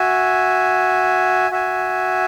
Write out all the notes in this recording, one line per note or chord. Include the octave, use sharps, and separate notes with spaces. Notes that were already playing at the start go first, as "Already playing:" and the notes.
Already playing: F#4 E5 G#5
F#4 E5 G#5